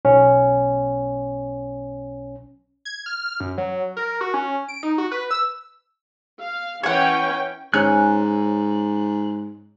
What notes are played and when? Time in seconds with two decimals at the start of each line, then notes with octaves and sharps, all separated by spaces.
0.05 B1 C#4
2.85 G#6
3.06 F6
3.40 F#2
3.58 F#3
3.97 A#4
4.21 F#4
4.34 C#4
4.68 D7
4.83 D#4
4.98 F#4
5.12 B4
5.31 E6
6.40 F5
6.83 E3 C#4 C#5 F#5 G5
7.74 G#2 C#4 F#6